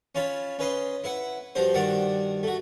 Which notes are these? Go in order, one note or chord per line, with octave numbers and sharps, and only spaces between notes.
C#4 F4 C#5 A5 B5
C#4 B4 D#5 C6
E4 B4 F#5
G2 F3 F#4 C5
G2 D#3 F#4 D5 F#5
A3 F#4